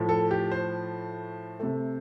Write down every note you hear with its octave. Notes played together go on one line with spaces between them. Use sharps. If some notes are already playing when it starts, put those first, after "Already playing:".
Already playing: A2 F3 A3
A4
G4
C5
C3 A3